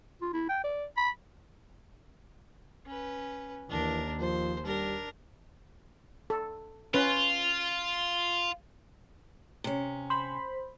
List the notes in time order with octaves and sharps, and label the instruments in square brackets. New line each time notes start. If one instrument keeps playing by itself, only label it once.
[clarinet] F4
E4
G5
D5
B5
[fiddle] C#4 B4
[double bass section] D#2 [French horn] E3 [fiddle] D4 A#4
[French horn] F3 [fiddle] C5
[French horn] G3 [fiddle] D4 A#4
[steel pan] A4
[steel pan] C#4 B4 [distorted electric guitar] F4
[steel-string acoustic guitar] C3 C#4
[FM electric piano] C5 B5